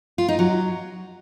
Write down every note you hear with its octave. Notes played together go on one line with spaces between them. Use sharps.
F4
D#4
F#3